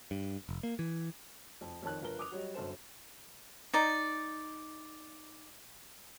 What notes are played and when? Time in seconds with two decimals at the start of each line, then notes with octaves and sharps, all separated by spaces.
0.11 G2
0.49 F1
0.63 A#3
0.79 E3
1.61 F2
1.83 F2 D#3 C#5 A5 F#6
2.01 G1 F3 A#4 B4 G7
2.19 D6 D#6 F7
2.31 F#3 G3 C#5 D#5
2.54 G1 F#2 A4 C5 E7
3.74 D#4 D5